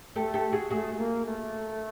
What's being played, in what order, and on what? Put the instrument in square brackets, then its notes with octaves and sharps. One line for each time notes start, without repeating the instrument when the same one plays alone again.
[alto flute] A3 [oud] G4 A4
[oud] G4 A4
F#4 G#4
[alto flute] A3 [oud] F#4 G#4
[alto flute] A3
A#3
A3